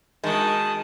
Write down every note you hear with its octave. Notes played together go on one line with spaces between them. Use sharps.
D#3 G#3 F#4 A5 D#6